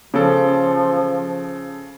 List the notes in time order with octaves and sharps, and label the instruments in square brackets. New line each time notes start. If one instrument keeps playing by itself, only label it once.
[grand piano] C#3 A4 [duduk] F3